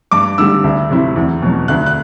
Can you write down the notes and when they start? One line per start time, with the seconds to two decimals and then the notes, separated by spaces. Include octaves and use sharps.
0.11 G2 D6
0.38 D3 G3 E6
0.64 D2
0.90 C3 F#3 C4 E4
1.16 E2
1.42 B2 F#3
1.68 D2 F#6
1.86 F#6